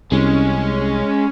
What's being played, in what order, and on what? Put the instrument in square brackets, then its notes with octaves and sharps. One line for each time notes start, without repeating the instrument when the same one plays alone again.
[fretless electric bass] C2 [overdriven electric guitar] G#3 [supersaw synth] C#4